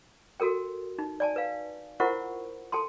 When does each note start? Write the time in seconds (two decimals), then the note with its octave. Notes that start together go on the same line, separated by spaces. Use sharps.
0.40 F#4 A4 A#4 G5
0.99 D#4
1.20 D5 G#5 A5
1.36 B4 F5
2.00 E4 F4 A#4 C5 F#5 C#6
2.72 A4 G5 A5 C6